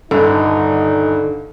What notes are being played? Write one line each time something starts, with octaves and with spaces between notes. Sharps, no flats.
D#1 G2 D3 D#4 A4